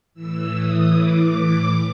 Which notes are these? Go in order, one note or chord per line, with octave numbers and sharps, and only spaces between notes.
A2 E3 E6
D#6
D6